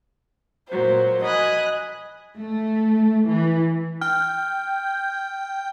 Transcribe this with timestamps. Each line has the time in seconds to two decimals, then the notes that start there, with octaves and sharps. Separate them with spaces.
0.69 A#2 F#3 C5
1.24 D#5 G#5 B5 D#6 F#6
2.37 A3
3.29 E3
4.01 G5 F6